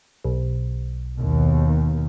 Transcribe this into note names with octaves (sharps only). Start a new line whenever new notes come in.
B1
D#2 B2